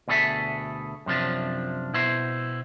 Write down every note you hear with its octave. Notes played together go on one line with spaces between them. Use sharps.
D2 B2 G#4 A4 E5
F#2 C3 F3 D4
B2 E4 C5